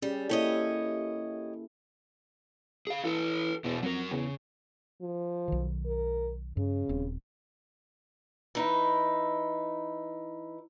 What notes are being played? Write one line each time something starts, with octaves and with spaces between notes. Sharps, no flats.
G3 C#4 G4 G#4
A#3 E4 G4 A4 C#5 D#5
G#4 F5
E3 A4 B4
E2 B2 E4
F2 F#3 A#4
E2 C#3
F3
B1 D#3
A#4
G2 C#3
D#1 C4
E3 D#4 E4